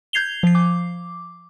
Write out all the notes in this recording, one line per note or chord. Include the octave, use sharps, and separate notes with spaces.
G6 G#6 C7 F7 G7
F3 C7
D6